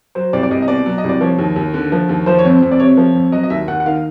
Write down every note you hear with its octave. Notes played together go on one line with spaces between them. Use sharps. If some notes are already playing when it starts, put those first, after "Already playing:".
F#3 C5
C2 D5
D5
C2 D#5
D#5
B2 D5
F#3
D#5
C2
D5
F3 C#5
D#2
D#2
D3
F3
D#2
F3 C5
C#5
F2
C5
F2
D5
C3 C#5
F3
F2
F#3 D#5
D#5
D#2 E5
D#2 F#5
F#5
D#3 F5